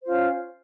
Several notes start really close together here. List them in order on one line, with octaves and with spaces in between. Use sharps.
C5 F4 C#4